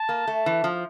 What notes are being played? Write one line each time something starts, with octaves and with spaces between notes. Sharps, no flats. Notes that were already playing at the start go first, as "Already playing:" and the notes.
Already playing: A5
A#3
A3
E3
F3